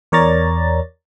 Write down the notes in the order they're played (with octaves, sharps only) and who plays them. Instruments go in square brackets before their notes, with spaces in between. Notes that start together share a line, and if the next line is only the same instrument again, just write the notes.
[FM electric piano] E2 A#4 C#5 D5 A#5 A6